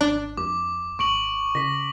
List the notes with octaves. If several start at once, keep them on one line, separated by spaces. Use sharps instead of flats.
G#1 D4
F2 D6
G#1 C#6 D7 F#7
C#3 A#6 B6